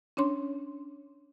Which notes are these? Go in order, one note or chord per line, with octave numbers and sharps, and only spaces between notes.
C#4 D4 C#5 C6